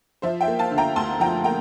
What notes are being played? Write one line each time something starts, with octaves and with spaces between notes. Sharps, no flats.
F3 C5 E5
E5 G5
A#3
F5 A5
D3
G5 A#5
D2 A5 C6
F3 G5 A#5
A#3 G5 A#5